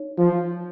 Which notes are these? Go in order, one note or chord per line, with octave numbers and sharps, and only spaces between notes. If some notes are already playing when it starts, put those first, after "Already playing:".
Already playing: D#4 C#5
F3